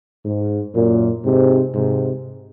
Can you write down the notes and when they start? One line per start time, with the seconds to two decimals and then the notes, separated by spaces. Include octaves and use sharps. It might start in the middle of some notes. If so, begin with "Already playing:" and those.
0.26 G#2
0.75 F#2 A#2
1.25 G#2 C3
1.75 G#2 C3